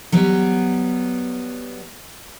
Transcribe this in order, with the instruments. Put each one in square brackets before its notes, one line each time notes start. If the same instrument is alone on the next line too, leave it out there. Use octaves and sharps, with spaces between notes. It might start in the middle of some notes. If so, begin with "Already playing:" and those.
[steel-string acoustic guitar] F#3 G3 B3